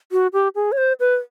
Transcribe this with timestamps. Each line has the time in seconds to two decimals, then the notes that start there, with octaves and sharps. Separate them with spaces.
0.12 F#4
0.33 G4
0.55 G#4
0.72 C#5
0.78 C5
1.00 B4